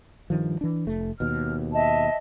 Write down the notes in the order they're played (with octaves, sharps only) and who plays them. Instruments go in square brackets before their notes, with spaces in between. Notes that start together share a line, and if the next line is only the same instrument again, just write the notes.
[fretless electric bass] G2 D#3 F3
E3 D4
F1 A3
[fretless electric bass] D#2 B2 [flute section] F6
[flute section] D#5 E5 A5